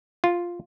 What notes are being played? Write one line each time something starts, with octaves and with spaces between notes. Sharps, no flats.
F4